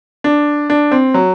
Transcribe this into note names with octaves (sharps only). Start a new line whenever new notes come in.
D4
D4
C4
F#3